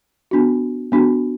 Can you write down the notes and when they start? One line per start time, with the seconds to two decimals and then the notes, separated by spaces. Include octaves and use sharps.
0.31 B3 D4 F#4
0.92 B3 D4 F#4